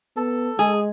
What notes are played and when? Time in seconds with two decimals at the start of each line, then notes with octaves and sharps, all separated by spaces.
0.17 B3 A4
0.59 G#3 G#4